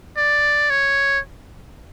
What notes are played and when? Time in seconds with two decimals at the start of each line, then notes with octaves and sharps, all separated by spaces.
0.17 D5
0.70 C#5